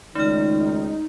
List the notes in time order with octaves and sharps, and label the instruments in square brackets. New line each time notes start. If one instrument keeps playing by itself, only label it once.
[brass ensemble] C#2 D#3 [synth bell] A3 F6 [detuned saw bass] D#4